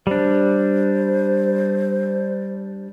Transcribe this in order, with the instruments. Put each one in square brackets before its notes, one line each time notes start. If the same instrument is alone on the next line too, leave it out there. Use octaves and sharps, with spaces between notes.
[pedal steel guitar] G3 D4 [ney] C5